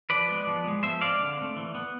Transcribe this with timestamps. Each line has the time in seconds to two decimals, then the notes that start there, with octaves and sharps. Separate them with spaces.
0.10 F3 B4 D5
0.28 G#3 B3
0.47 F3
0.64 G#3 B3
0.83 F3 C5 E5
1.01 G#3 C4 D5 F5
1.20 D3
1.37 A3 C4
1.57 E3
1.75 B3